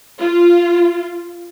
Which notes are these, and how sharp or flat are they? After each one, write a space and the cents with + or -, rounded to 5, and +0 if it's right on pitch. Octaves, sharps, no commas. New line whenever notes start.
F4 -10